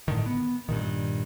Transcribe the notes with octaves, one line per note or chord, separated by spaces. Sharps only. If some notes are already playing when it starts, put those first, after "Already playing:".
A2 D3 D#3
B3
G2 A#2 D#3